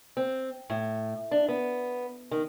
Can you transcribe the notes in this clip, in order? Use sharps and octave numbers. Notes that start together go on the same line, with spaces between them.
C4
A2
D4
B3
D#3